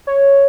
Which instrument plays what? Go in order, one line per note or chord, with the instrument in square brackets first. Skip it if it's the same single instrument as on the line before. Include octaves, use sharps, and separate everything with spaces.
[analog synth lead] C#5